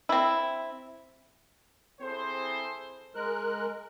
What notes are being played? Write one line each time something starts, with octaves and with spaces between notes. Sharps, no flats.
C4 E4
C4 E4 G#4 A4 C5
G#3 A#4 F#6